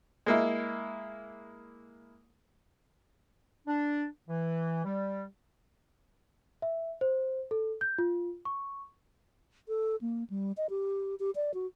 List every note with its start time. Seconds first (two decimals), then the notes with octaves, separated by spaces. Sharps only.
0.26 G#3 A#3 E4
3.66 D4
4.28 E3
4.84 G3
6.62 E5
7.01 C5
7.51 A4
7.81 G6
7.98 F4
8.45 C#6
9.68 A4
10.01 A#3
10.30 G3
10.57 D#5
10.70 G4
11.20 G4
11.36 D5
11.54 F#4